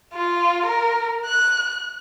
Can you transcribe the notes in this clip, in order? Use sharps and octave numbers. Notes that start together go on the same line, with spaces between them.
F4
A#4
F#6